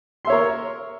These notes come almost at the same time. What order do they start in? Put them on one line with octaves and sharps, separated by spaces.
C6 E5 C#5 A#4